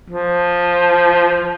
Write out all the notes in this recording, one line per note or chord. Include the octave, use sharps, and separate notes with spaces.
F3